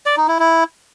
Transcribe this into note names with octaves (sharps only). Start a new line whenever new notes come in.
D5
D#4
E4
E4